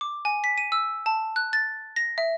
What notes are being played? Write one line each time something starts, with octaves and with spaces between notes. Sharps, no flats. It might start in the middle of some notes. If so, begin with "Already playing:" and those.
D6
G#5
B6
D#7
E6
A5
F#6
A6
A#6
E5